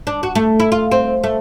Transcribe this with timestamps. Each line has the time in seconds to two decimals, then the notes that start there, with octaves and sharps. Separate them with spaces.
0.07 D4
0.23 F#4
0.35 A3
0.60 E4
0.72 F4
0.91 C4
1.24 A3